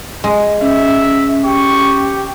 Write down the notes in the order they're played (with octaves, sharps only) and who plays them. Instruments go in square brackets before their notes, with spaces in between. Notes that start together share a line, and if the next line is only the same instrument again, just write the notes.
[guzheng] G#3
[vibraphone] C#4 [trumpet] E5
[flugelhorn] G4 [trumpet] C#6